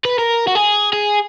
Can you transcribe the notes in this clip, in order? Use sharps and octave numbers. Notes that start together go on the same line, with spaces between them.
B4
A#4
F#4
G#4
G#4